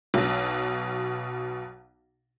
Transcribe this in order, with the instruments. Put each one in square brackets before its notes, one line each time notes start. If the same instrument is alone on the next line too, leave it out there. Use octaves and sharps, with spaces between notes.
[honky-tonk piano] B1 B2